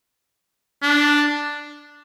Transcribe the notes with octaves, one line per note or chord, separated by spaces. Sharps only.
D4